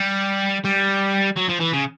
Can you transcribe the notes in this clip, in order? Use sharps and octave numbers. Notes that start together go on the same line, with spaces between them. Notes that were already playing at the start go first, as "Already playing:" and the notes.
Already playing: G3
G3
F#3
F3
E3
C#3